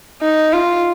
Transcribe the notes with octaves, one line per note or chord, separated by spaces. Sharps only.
D#4
F4